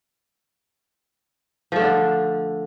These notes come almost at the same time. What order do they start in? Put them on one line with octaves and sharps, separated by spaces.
F3 A3 D3 D4